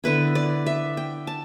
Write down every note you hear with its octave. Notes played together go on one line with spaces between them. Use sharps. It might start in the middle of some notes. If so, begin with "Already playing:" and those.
D3 B3 E4 B4
D5
E5
G5
A5